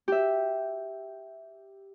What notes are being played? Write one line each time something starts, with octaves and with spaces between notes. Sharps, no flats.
G4 E5